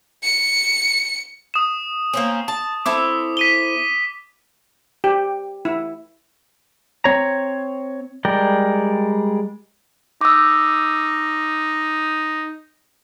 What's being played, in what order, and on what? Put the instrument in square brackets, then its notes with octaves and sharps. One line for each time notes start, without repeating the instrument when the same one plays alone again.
[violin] C#7
[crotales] D#6 E7
[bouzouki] A#3 C4 C#4
A5
[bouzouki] C4 E4 A4 [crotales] D6
[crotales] B6 D#7 G7
[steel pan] G4
E4
[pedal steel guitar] C4 C#5 A#5
G3 G#3 A#4 D5 G5
[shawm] D#4 [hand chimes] D6 E6